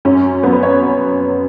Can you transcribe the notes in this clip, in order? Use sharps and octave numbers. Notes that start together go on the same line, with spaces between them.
F#2 F#3 C#4
F#2 F#3 B3
B4
C#5